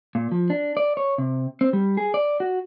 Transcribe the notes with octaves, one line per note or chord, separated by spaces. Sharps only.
A#2
F3
D4
D5
C#5
C3
C4
G3
G#4
D5
F#4